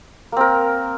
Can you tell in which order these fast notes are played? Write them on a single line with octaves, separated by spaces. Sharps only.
A#3 C4 A#4